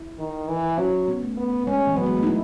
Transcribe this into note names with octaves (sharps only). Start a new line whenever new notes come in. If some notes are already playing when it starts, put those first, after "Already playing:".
Already playing: E4
D#3
E3
F#3 C#4
B3
A3
B3
G#3 C#4
E3
F#3 B3
G#3
A3
D#4
E4